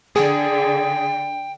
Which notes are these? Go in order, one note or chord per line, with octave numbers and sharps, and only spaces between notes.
D3 G#4 G5